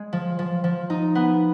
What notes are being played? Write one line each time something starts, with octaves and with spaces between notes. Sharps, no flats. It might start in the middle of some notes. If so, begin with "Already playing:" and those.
Already playing: G#3
F3
F3
F3
D#4
B3